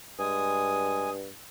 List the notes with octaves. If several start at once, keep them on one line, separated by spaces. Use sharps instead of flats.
G2 G#3 G#5 D#6